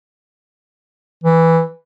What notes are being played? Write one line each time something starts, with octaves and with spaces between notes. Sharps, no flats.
E3